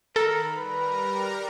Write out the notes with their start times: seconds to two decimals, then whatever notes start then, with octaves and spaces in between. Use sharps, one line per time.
0.16 D#3 A4 A#4 B5
0.56 G3 A#4 B4 A#5